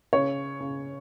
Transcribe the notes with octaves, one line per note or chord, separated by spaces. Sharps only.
C#3 C#5
C#3